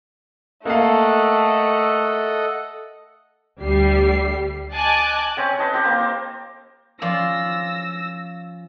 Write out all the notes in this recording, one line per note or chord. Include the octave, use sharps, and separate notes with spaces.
A3 A#3 A4 D#5 F5 F#5
D2 G3 C7
D#5 G#5 A5 D6 F#6
C4 C#4 F#5
B4 D#5 A5
C4 G4 C5
A#3 C5
C5
F3 C#4 F4 D5 F5 E6 A#6